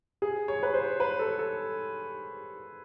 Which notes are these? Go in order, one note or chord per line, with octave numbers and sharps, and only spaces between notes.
G#4
C#5
B4
C5
B4
A4
A4